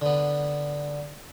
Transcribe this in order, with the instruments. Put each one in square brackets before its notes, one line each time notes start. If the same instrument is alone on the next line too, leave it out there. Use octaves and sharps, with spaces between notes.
[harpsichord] D3 B3